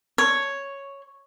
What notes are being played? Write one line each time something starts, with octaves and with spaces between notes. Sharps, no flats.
C#5